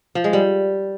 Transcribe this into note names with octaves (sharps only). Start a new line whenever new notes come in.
F3
G#3
G3